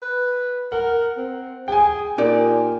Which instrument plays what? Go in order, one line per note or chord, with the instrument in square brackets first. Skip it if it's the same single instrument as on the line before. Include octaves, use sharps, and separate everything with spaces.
[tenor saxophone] B4
[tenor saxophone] A#4 [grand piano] F#5
[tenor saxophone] C4
[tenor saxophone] G#4 [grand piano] G5 G#5
[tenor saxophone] A#2 [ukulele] D#4 G4 D5